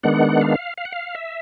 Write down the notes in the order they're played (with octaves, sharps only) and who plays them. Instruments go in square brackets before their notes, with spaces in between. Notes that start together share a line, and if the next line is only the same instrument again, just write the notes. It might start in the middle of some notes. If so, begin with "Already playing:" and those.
[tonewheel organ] D#3 G#3 B3 D4 F#5
F5
F5
F#5
F5
E5